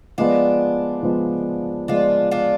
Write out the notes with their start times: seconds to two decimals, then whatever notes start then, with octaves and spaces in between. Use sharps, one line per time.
0.18 F3 G#3 B3 D4 F4
1.03 F3 G#3 B3
1.88 F3 G#3 B3 D4 F4
2.31 D4 F4